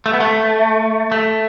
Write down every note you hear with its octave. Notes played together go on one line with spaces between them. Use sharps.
A3
B3
A3
A3